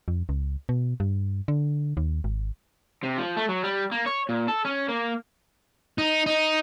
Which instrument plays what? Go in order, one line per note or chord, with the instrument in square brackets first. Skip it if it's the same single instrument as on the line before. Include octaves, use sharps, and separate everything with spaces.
[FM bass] F2
C#2
B2
G2
D3
D#2
G#1
[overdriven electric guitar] C3
F3
A3
F#3
G3
A#3
C#5
A#2
A4
C#4
A#3
[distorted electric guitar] D#4
D#4